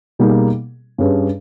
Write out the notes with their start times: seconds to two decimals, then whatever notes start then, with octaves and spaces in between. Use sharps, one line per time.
0.19 B2 G3 A#3 D#4 G#4
0.98 G2 G3 C#4 G#4 B4